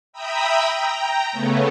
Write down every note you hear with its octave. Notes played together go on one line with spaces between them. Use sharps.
E5 G5 A#5 B5 D#6 E6
G5 A#5
C#3 A3 B3 C#4